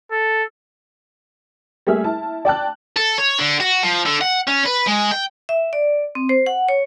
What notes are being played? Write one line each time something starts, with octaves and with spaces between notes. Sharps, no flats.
A4
G3 A3 A#3 G#4 E5 F6
E4 A5
D5 G5 A5 F#6
A4
C#5
D3
F#4
F3
D3
F#5
C#4
B4
G#3
G5
E5
D5
C4
C5
F#5
C#5